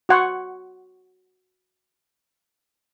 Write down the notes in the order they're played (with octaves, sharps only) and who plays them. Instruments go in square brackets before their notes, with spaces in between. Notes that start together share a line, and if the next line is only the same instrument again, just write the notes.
[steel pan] F#4 F#5 C6 C#6